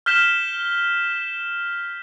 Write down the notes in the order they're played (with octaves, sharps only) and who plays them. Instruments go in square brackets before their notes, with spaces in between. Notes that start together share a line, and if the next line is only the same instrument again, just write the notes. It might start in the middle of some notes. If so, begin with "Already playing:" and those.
[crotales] F6 G6 B6 E7 G7